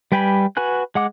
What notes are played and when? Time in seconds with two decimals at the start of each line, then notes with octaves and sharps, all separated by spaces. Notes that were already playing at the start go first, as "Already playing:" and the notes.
0.12 G3 B4 G5 G#5 B5
0.57 F#4 B4 G#5 F#6
0.95 G#3 F#5 D6